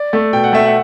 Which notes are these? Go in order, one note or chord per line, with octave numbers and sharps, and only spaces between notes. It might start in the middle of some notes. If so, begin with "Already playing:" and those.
Already playing: D5
A3
B2 G5
F#5
A3 E5
F#5